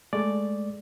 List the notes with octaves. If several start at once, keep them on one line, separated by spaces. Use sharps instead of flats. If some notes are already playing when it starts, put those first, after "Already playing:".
G#3 A3 D5